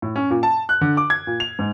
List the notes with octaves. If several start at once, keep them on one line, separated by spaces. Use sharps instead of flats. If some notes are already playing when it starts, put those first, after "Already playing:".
A2
C#4
A#2
A5
F#6
D3
D6
G#6
A#2
F7
G#2